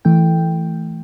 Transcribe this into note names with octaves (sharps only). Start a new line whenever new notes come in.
E3 A3 G5